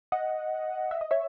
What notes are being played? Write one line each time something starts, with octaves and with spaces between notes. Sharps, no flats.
D#5 F#5
E5
D#5
C#5 E5